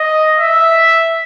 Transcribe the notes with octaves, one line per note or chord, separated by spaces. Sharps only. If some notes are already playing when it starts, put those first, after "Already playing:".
Already playing: D#5
E5